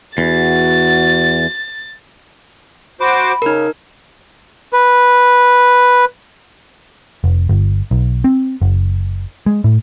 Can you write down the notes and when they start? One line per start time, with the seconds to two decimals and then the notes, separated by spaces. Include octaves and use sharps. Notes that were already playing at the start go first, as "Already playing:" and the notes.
0.18 E2 F#4 A6
3.00 F#4 C5 B5 D6
3.42 C#3 D#4 A#4
4.73 B4
7.24 F1
7.49 G1
7.91 B1
8.24 C4
8.62 F#1
9.46 G#3
9.64 A2